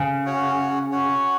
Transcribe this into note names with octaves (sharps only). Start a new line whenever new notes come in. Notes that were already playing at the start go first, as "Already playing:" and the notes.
Already playing: C#3
C#4 F#4 C#5 F#5
C#4 F#4 C#5 F#5